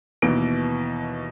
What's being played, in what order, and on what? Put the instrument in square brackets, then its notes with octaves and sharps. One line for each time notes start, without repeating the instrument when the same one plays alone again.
[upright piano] D#2 B2 E3 D7